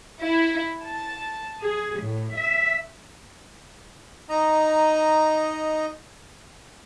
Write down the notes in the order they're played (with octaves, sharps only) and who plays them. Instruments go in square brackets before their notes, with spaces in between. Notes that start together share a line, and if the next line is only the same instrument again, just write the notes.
[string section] E4
A5
G#4
A2
E5
[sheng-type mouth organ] D#4 D#5 A#5